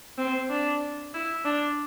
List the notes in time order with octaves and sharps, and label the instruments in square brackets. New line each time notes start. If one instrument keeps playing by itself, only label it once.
[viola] C4
D4
E4
D4